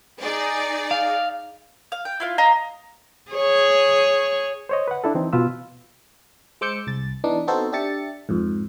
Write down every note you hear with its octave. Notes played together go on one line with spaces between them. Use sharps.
D#4 G#4 D5
F5
F5
G5
E4 F4 F5
D#5 F5 A#5
G#4 C#5
C5 C#5 D#5
B4 F#5
D4 E4 A4
E3 C4 D#4
B2 F4 B4 E6
G#3 C5 D6 E6 G6 C#7
C2 A6
E3 B3 D4 D#4
B3 C4 D#4 F#4 A4 C5
D4 G4 E5 A6 C#7
F2 G#2